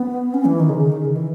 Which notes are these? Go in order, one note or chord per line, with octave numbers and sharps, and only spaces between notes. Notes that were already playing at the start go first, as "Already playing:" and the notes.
Already playing: B3
C#4
E3
D#3
C#3
D#3
C#3
D#3
E3